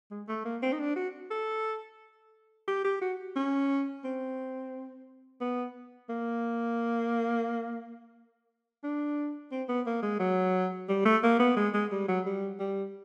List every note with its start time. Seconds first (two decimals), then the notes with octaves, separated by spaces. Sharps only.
0.11 G#3
0.28 A3
0.45 A#3
0.62 C4
0.72 D#4
0.79 D4
0.96 F#4
1.30 A4
2.68 G4
2.84 G4
3.02 F#4
3.36 C#4
4.04 C4
5.41 B3
6.09 A#3
8.84 D4
9.51 C4
9.69 B3
9.86 A#3
10.03 G#3
10.19 F#3
10.88 G3
11.05 A3
11.23 A#3
11.40 B3
11.56 G#3
11.74 G#3
11.92 G3
12.08 F#3
12.26 G3
12.60 G3